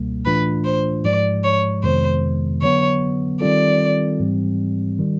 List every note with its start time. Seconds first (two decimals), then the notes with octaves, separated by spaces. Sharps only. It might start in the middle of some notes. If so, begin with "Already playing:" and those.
Already playing: C#2 B2 G3 A#3
0.25 A2 E3 A3 D4 F4 B4
0.65 C5
1.05 G#2 F3 G#3 D5
1.44 C#5
1.83 F2 C3 D#3 G#3 B3 C5
2.62 D3 F#3 B3 C#5
3.41 D#3 G3 C4 F4 A4 D5
4.20 G#2 E3 G3 C4
4.99 D#3 G3